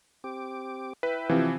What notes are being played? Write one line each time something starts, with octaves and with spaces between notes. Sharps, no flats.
C4 G4 D6
E4 B4 E5 G5
C3 E3 F3